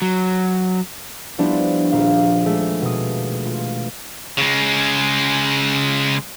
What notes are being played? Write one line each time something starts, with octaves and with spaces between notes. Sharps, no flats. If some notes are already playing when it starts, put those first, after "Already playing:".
F#3
F3 G3 B3 D4 E4
D#1 A#1 F5
G#3 A3
B2 D#6
F4
C#3 G#3